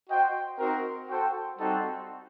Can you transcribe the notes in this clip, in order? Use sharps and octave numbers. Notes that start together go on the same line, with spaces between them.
F#4 C5 D#5 G5
C4 D#4 F#4 A#4
F#4 A4 C5 G5
G3 C4 D#4 F#4 A4